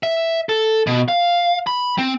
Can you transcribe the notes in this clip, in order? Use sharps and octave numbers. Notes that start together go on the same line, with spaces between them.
E5
A4
B2
F5
B5
C4